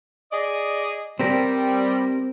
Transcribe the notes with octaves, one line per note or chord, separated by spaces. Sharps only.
G#4 D5 D#5
G3 C4 G4 A#4